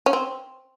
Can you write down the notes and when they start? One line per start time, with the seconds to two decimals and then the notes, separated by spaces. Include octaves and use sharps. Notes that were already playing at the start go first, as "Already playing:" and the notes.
0.06 C#4
0.13 C4